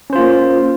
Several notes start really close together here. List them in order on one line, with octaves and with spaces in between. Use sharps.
C#4 C5 F4 A#3